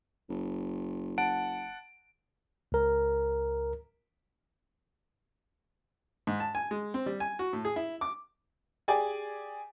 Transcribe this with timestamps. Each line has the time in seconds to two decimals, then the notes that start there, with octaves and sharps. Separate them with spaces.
0.29 F#1
1.18 F#5 A5 D7
2.72 C#2 A#4
6.27 G#2
6.40 A5
6.55 G#5
6.71 G#3
6.94 C4
7.06 G3
7.20 G#5
7.39 F#4
7.53 A2
7.65 G#4
7.76 E4
8.01 D6
8.88 G4 G#4 D5 G#5